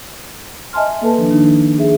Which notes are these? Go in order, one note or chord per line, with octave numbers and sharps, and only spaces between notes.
D#5 E5 G#5 A5 C6 F6
A#3 A4 B4 A5
D#3 F3 D4
D#3 D4 D#4
G#4 E5